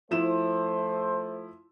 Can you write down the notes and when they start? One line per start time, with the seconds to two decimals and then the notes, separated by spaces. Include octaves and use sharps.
0.11 F3 A3 E4 C5 E7